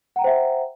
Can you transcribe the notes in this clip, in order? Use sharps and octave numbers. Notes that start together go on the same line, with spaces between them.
C5 E5 F#5 G5 A#5